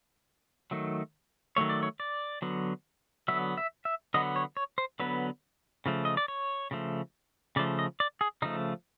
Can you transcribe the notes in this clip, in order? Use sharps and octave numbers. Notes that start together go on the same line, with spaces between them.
D#3 F#3 A3
D#3 F#3 A3 C#5
D5
C#5
D5
D3 F#3 B3
D3 F#3 B3 E5
E5
E5
D3 F#3 B3 D#5
C#5
C#5
C5
D3 F#3 B3 B4
C#3 F3 A3
D#5
D5
C#5
C#3 F3 A3
C#3 F3 A3 D5
D#5
D5
G#4
C#3 F3 A3 D#4